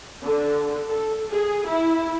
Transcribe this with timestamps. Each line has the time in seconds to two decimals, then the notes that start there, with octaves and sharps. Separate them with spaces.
0.24 D3
0.89 A4
1.31 G#4
1.68 E4